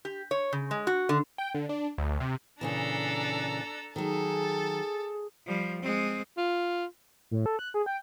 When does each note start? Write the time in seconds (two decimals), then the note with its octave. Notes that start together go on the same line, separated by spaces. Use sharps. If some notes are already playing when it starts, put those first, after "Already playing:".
0.05 G4
0.31 C#5
0.53 C#3
0.71 G#3
0.87 F#4
1.09 D3
1.38 G5
1.55 D3
1.69 D4
1.98 D2
2.20 C3
2.61 A#2 C#3 E3 D4 A4 A#5
3.96 D#3 F#3 G#4 A4
5.46 F3 G3
5.83 G#3 C4
6.37 F4
7.31 A2
7.46 A4
7.59 F#6
7.74 G#4
7.86 G5